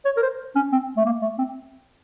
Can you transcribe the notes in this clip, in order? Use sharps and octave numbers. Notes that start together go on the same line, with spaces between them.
C#5
A#4
C5
C#4
C4
A3
A#3
A3
C4